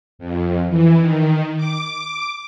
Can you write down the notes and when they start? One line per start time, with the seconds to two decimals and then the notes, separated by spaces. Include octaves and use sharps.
0.19 F2
0.68 E3
0.99 D#3
1.57 D6